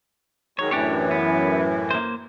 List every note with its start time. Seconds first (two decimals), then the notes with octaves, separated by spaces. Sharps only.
0.59 D#3 F#3 G#3 C#5
0.71 F#2 A2 E3 D4 G4 C#5
1.11 B3
1.91 A#3 C5